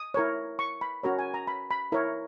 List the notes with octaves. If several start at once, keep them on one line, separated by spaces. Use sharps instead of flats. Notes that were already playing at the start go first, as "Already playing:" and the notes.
Already playing: D#6
E4 A#4 C#5
C#6
B5
C#4 F#4 A#4 C#5 A#5
G#5
A#5
B5
B5
E4 A#4 C#5